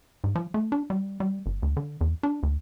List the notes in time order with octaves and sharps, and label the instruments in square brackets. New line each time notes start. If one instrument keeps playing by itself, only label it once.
[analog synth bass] G#2
F3
A3
D4
G3
G3
G1
D2
D3
E2
D4
D2